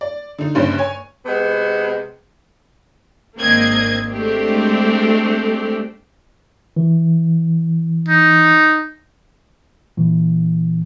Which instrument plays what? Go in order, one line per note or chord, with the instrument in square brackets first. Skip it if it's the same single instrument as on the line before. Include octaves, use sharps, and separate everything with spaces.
[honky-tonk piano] D5
D3 D#4
F#1 G2 G3 C#4 C5
C#5 G#5
[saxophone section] C3 G#3 B3
[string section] G#1 A#3 C4 D4 D#5 G#6
G#3 A3 C4 D4 G4
[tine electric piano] E3
[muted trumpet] D#4
[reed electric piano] A#2 E3